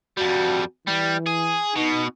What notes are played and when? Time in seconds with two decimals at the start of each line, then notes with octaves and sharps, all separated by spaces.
0.17 F2 G3 F#4
0.87 E3 G3
1.26 G#4
1.76 B2 D#4